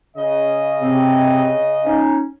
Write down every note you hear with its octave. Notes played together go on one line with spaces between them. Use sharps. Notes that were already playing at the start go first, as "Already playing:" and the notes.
C#3 D#5
C3 C4
C#4 D#4